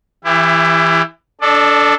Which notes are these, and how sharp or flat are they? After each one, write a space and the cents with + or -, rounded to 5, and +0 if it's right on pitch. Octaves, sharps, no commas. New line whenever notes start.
E3 +0 E4 +25 G4 +35
D4 -20 A4 +0 D5 +40